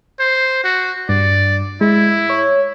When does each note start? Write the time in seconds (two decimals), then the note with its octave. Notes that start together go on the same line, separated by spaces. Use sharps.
0.20 C5
0.64 F#4
1.09 G2 D5
1.81 G#3 E4
2.30 C#5